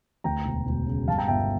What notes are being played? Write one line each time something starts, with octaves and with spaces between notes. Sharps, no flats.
D2 G5 A#5
E1
E1
C#3
G2 F5 A5
G5 A#5
G1 E5 G5